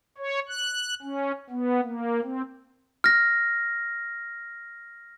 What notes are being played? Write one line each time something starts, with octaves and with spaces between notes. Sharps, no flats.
C#5
F#6
C#4
B3
A#3
C4
F6 A#6